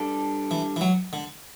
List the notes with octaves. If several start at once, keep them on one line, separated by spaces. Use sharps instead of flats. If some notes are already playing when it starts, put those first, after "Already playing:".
Already playing: G3 D4 A4
E3
E3
F#3
D3